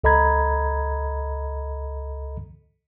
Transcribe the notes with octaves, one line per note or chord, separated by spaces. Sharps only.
C#2 A4 D#5 A#5 B5 G#6